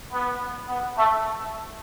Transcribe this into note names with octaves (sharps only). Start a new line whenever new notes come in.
B3
B3
A3